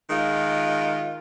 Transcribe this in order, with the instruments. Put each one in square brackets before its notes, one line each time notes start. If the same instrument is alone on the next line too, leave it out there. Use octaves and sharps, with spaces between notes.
[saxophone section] D#3 G#3 F4